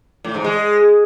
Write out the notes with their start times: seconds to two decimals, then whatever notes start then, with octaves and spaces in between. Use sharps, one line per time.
0.25 A2
0.34 G#2
0.44 G#3